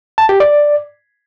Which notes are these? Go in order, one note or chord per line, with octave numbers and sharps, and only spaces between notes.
A5
G4
D5